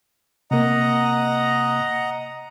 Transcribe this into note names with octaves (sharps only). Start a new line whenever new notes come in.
C3 A#3 D#5 F#5 A#5